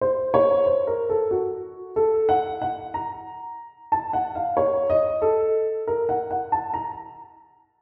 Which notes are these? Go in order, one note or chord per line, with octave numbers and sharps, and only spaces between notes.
C5
C#5
C5
A#4
A4
F#4
A4
F#5
F#5
A#5
A5
F#5
F5
C#5
D#5
A4
A#4
F#5
F#5
A5
A#5